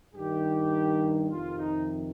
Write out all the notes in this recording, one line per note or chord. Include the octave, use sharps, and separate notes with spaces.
G2 D#3 G4
F2 C3 D#3 F4
D#4